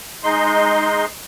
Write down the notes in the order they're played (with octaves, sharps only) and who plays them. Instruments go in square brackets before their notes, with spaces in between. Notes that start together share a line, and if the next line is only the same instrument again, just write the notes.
[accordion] G#3 D#4 C6